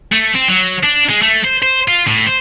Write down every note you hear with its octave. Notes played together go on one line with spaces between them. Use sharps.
A3
C4
F#3
D4
G#3
A3
C5
C5
F4
A2
C5